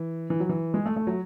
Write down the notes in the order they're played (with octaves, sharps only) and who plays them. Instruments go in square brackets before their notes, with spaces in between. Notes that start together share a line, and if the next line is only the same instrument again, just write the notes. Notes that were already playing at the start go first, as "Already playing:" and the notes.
Already playing: [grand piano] E3
E3
F#3
E3
G#3
A3
A3
F#3